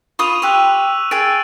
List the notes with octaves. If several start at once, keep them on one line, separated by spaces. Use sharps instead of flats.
F4 B5 C#6 D#6 D#7 F7
G4 C6 C#6 E6 F#6
G#4 G5 E6 A6 D7